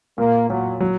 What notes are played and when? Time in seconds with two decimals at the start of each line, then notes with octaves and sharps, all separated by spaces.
0.18 A#2 A#3
0.50 A#2 F#3
0.80 F#3